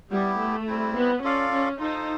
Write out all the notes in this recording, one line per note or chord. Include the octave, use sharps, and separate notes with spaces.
G3 B3 E4 G4
A3
G3 C4 E4
B3
C#4 F4 A4 D5 F5
C#4
D#4 F4 A4 C5